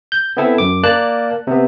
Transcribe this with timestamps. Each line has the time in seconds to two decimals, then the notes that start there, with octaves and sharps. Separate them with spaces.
0.12 G6
0.37 B3 C4 E4 A4
0.58 F#2 D6
0.83 A#3 D5 A5 F#6
1.47 C3 B3